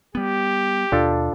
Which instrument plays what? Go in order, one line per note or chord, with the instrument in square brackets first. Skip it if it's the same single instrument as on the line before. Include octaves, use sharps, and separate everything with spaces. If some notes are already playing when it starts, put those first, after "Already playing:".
[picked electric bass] G3 B3 [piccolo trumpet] G4
[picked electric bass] D#2 B2 [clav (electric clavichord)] D4 F4 A4